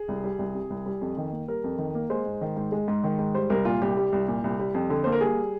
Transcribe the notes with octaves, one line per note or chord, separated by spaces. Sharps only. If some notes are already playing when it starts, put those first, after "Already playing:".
Already playing: G#4
C2
G3
C2
C3
C2
G3
F2
D#3
A#3
G3 A#4
F2
D#3
A#3
G#3 C5
G#2
D#3
G#2
G#3
G#2
D#3
G#2
G3 C5
C2 A#4
A#2 F4
C2 G4
G3
C2
A#2
C2
G3
F2
D3
A#3 C5
A#4
G3 G#4